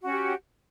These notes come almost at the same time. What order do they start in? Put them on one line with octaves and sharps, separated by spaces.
F#4 C#4 G4